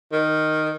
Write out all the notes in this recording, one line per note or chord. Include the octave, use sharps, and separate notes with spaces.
D#3